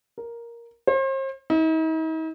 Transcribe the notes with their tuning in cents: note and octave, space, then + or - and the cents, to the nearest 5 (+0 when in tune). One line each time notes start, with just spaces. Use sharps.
A#4 +5
C5 +40
D#4 +45